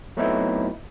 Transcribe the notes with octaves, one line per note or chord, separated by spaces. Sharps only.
F#3 A3 B3 C4 D#4 E4